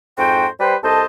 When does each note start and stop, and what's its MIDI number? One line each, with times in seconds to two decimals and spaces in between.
0.18 0.47 41
0.18 0.47 44
0.18 0.47 66
0.18 0.47 72
0.18 0.47 79
0.60 0.76 55
0.60 0.76 67
0.60 0.76 71
0.60 0.76 72
0.83 1.05 36
0.83 1.05 69
0.83 1.05 72
0.83 1.05 75
0.83 1.05 81